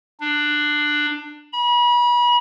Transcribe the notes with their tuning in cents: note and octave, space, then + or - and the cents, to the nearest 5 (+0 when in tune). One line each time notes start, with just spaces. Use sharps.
D4 +15
B5 -35